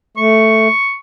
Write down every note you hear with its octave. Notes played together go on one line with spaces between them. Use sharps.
A3 C#6